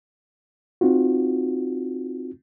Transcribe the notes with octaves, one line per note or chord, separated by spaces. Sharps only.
C4 D#4 F4 F#4